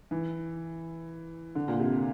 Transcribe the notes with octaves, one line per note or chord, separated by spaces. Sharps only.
E3
D3
A#2
C3